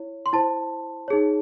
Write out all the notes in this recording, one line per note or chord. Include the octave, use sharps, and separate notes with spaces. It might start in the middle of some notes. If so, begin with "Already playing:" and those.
Already playing: E4 C#5
C6
E4 C5 A5
D#4 G#4 C#5